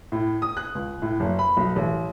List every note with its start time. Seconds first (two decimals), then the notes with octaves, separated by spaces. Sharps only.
0.12 A2
0.42 D#6
0.57 F#6
0.75 C#2
1.02 A2
1.20 F#1
1.39 B5
1.57 B1
1.76 A1